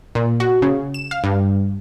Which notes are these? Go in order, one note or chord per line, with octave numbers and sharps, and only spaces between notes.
A#2
F#4
C#3
E7
F5
G2